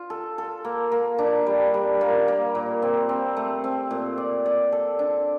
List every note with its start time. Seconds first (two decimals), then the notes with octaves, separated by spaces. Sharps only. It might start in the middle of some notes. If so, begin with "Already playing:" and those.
Already playing: F4
0.10 A4
0.38 A4
0.65 A#3
0.92 A#3
1.18 D4
1.46 G3
1.74 G3
2.01 A#3
2.28 A#3
2.55 A#2
2.82 C4
3.09 C4
3.37 A3
3.64 C4
3.91 A#2
4.17 D5
4.46 D5
4.72 A4
4.99 D4